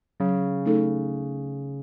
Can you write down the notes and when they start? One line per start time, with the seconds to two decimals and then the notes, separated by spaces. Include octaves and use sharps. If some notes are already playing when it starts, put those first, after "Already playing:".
0.20 C#3 F#3
0.66 A3 D#4 A4